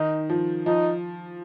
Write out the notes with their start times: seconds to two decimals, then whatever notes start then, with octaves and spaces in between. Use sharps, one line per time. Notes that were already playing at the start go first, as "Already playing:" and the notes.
Already playing: D#3 D#4
0.30 F3
0.66 F3 D#4